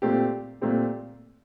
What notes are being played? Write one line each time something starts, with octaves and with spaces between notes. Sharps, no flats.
A#2 A3 C4 G4
A#2 A3 C4 G4